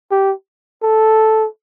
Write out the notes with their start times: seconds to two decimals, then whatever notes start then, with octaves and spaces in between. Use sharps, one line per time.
0.11 G4
0.83 A4